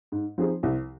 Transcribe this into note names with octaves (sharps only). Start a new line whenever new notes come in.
G#2
F3 C4 D#4 G#4
C2